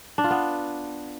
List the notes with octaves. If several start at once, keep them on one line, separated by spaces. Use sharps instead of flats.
D4
F4
B3